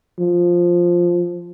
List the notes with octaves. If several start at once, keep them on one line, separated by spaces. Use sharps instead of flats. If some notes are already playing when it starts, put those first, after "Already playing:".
F3